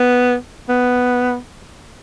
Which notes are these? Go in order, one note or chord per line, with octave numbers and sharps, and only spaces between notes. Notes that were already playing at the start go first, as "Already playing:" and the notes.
Already playing: B3
B3